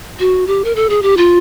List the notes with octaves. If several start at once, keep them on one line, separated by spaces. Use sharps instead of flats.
F#4
G4
A#4
A4
G#4
G4
F4